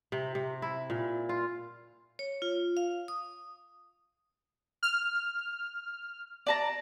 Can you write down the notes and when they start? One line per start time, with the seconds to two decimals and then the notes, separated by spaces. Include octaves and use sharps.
0.12 C3
0.35 C3
0.62 E4
0.90 A#2
1.29 F4
2.19 C#5
2.42 F4
2.77 F5
3.08 D#6
4.83 F6
6.47 D5 A5 A#5